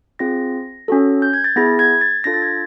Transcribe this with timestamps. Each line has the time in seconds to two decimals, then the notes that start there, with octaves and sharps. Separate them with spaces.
0.19 C4 F4 G#4 A#6
0.88 C#4 F#4 A4
1.22 G6
1.33 G#6
1.44 A6
1.56 B3 E4 G#4 A#6
1.79 G#6
2.01 A6
2.24 D4 F4 A4 A#6
2.34 A6
2.42 G#6